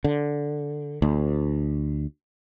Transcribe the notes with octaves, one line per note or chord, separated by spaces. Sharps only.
D3
D2